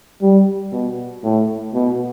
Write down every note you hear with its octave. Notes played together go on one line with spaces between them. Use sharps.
G3
B2
A2
B2